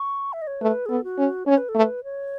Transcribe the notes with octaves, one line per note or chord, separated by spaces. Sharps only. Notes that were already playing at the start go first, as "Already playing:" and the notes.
Already playing: C#6
E5
D#5
C#5
A3 B4
G#4
B3 A4
F#4
C#4
C#4 C#5
B4
A4
A3
B4
C#5